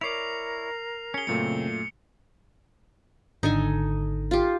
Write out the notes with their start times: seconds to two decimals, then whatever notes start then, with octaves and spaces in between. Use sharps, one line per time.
0.01 E4 A#4 C#5 D5 C7 F7
1.14 C#4 G#4 C#7 G7
1.27 F#2 A#2 C#3 A3 C4 C#7
3.43 G#1 D3 D#4 A4 G#5
4.31 F4 G4